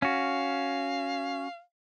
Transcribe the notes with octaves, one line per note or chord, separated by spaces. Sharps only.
C#4 F#4 F5